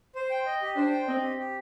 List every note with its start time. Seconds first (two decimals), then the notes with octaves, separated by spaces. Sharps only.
0.15 C5
0.30 G5
0.46 D#5
0.62 G4
0.77 D4 C5
0.92 G5
1.08 C4 D#5
1.22 G4
1.38 G4